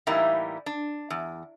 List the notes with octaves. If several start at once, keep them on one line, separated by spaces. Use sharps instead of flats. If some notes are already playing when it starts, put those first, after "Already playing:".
A2 E3 G3 A#3 D#4 E4
D4
E2